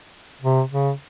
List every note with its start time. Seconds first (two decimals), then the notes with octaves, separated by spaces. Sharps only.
0.41 C3
0.71 C#3